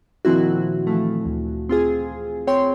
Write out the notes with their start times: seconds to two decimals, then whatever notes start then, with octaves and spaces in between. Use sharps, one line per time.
0.25 A#2 D#3 F3 C4 E4 F#4
0.87 E3 F3 A3
1.26 D2
1.69 C4 F4 G#4
2.47 C4 C#5 G5 C6